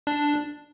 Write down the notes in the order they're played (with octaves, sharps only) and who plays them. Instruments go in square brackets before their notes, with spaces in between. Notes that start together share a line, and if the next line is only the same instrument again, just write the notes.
[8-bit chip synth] D4